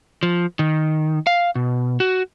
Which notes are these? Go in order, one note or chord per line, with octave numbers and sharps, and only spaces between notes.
F3
D#3
F5
B2
F#4